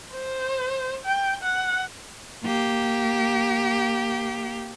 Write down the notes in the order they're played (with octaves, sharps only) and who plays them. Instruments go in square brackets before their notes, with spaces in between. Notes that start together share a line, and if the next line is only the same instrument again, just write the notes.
[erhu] C5
G5
F#5
[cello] A#3 G4